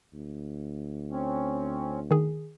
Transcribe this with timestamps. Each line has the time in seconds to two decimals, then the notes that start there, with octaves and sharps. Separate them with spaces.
0.13 D2
1.12 C4 C#4
2.11 D#3 G#4